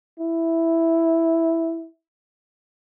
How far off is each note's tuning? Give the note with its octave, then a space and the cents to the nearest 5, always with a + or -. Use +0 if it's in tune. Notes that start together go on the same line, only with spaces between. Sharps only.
E4 +0